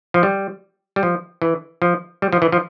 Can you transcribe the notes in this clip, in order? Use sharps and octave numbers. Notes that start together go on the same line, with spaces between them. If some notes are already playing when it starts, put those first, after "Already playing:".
F3
G3
G3
F3
E3
F3
G3
F3
E3
F3